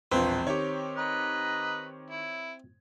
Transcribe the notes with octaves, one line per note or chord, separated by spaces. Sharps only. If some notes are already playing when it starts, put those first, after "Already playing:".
E1 A#1 C4 F4 B4
D#3 G4 C#5
B4 D#5 A#5
E4